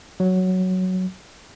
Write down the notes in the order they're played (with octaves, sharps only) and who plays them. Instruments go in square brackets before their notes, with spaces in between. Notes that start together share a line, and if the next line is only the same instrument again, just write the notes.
[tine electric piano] F#3